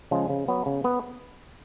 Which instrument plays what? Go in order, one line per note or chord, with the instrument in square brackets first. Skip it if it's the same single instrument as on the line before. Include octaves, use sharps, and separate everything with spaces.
[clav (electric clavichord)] C#3 F3 G#3
C#3
F#3 B3
C#3
B3